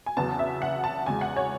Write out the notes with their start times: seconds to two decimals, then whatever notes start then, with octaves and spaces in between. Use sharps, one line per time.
0.06 G#5
0.17 E2 C#3 F#3 B3 A5
0.39 E5
0.62 F#5
0.84 A5
1.06 E2 C#3 G#3 G#5
1.21 F#5
1.36 C#5